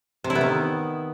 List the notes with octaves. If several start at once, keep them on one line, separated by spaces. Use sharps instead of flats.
C3
E4
B3
D#3